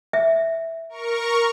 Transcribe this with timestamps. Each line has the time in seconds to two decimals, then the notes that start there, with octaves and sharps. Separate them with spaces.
0.13 E5
0.89 A#4 C#6